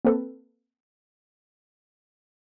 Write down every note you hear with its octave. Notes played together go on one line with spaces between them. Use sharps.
A#3 C4 A4 B4